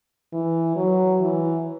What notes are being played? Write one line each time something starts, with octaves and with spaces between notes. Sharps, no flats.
E3
F#3
E3